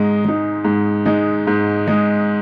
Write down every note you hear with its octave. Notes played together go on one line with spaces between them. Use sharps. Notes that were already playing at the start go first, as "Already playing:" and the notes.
Already playing: G#2 G#3 D#4
G#3 D#4
G#2
G#3 D#4
G#2
G#3 D#4